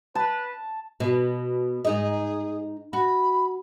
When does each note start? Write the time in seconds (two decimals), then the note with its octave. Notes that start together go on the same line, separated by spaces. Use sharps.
0.15 B4 A5
1.00 B2
1.85 G#2 D#4 G#4 D#5
2.93 F#4 B5